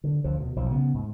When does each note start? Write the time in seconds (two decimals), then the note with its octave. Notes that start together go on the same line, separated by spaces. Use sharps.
0.04 D3
0.24 D2 D3 F3
0.40 B2
0.56 B1 B2 F3
0.70 C#3 B3
0.94 G#2